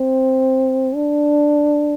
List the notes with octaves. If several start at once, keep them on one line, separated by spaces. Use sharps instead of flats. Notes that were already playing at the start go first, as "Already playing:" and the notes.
Already playing: C4
D4